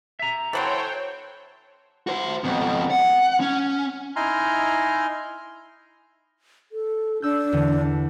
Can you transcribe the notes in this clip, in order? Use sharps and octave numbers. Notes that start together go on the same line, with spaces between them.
E5 A#5
E3 F#3 C4 A4 C5 C#5 F#5 G5
F#4 C5
F2 B2
F#5
C#4
D#4 E4 G#5 A#5 C6 F6
A4
D4 E6 G6
E2 D3